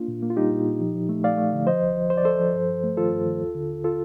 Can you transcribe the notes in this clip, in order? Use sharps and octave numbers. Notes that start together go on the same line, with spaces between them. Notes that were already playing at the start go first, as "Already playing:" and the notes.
Already playing: A#3 D4 F4
A#2
A#3
F4
G3 D#4 G4
A#2
A#2
F3
F3
A3
A3 D5 F5
A3
D3
F3 C5 D#5
C2
F3
F3 C5
D5
F3 A4 C5
F3
G2
G2
A3
D#3 F4 A4
G2
D#3
D#2
D3
D#2
F4 A4